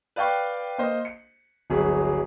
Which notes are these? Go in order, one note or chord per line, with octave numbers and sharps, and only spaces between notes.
B4 D5 F5 G5 C#6
A#3 C5 D#5
C#7
D1 G1 F#3 G#4